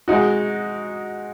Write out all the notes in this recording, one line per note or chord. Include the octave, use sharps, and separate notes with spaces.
G#3 D#4 F#4